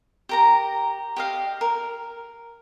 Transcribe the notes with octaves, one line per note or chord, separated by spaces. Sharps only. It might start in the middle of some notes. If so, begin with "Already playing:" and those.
G4 A#4 A#5
G4 D#5 F5
A#4